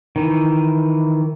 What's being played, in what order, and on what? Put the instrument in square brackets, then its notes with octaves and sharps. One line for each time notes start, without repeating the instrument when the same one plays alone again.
[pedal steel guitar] D#3 E3